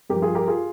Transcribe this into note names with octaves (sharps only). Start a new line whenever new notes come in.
G2 F3 G4 A#4
F4 G#4
G4 A#4
F4 G#4